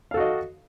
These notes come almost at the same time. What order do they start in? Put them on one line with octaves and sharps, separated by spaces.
F5 A4 F#4 D#5